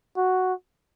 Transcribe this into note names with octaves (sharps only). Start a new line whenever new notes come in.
F#4